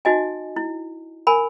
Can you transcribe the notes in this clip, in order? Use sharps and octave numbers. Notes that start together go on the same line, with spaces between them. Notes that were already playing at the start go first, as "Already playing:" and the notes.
D#4 F#4 D#5 G#5
E4
A#4 G#5 B5